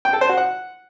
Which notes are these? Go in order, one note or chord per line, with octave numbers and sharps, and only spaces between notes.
G5
A4
C5
F#4
F#5